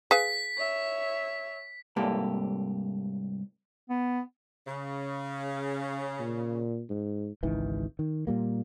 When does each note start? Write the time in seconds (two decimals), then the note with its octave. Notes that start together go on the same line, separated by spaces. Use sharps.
0.11 G#4 B4 F5 B6
0.58 C#5 E5
1.96 C2 G#2 A#3 G4 A4
3.90 B3
4.68 C#3
6.20 A#2
6.89 G#2
7.43 G#1 C#2 D#3 E3
7.99 D#3
8.27 A#2 G3 A#3